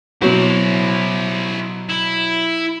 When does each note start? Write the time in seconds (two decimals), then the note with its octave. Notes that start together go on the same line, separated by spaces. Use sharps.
0.22 B2 F#3 E4 F#4 C5
1.89 E4